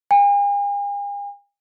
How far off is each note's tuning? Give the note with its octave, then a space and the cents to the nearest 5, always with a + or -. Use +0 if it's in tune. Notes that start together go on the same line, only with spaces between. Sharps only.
G#5 -45